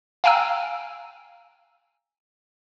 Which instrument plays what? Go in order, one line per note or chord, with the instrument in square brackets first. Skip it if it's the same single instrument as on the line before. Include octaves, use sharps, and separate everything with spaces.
[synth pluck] F5 G5 G#5 A#5 E6